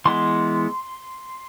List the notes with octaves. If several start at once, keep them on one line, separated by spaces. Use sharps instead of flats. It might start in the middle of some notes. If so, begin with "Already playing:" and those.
E3 G#3 B3 C6